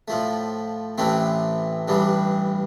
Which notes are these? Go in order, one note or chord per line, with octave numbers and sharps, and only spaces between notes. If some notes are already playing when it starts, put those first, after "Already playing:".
A2 F3 A3
A1 A2 E3 A3 C4
A1 G2 E3 G3